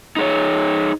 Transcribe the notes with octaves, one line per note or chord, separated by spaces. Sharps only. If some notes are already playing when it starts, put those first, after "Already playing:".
D#4 G#4 C#5